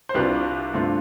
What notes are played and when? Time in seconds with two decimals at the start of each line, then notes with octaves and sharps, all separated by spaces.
0.09 C5
0.14 C2 C3 G3 D4 F4 G4 B4
0.73 G2 D3 A3 C4 F4